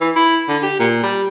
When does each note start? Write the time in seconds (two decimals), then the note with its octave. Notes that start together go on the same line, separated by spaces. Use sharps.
0.01 E3
0.16 E4
0.48 D3
0.63 G4
0.79 A#2
1.03 G3